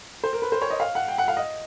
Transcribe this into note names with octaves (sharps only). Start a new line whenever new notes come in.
C5
A#4
B4
C5
C#5
D#5
F5
F#5
G5
F#5
F5
D#5